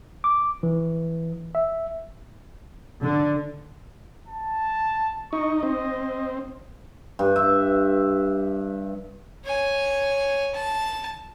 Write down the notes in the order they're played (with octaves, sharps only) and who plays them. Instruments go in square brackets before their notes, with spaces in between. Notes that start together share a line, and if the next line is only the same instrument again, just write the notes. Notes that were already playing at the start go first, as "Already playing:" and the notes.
[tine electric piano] D6
E3
E5
[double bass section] D3
[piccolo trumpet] A5
[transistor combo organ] D#4 [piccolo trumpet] C#6
[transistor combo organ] C4 [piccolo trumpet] D#5
[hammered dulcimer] G2
E5
[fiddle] C#5 G#5
A5